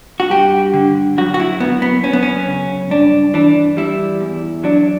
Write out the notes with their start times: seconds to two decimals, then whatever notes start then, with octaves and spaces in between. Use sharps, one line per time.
0.20 F#4
0.30 G2 G4
0.74 D3
1.18 F#2 F#4
1.34 F#4
1.40 E4
1.60 F#2 B3
1.82 B3
2.03 F#2 C#4
2.13 B3
2.23 C#4
2.47 C#3
2.90 G2 D4
3.34 E3 D4
3.77 G3 E4
4.20 E2
4.64 F#3 D4